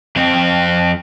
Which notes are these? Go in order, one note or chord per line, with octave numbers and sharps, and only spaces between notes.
F2 C4